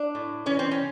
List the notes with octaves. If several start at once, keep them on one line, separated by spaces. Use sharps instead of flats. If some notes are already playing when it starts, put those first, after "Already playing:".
Already playing: D4
A2
E3 C#4
C4
C#4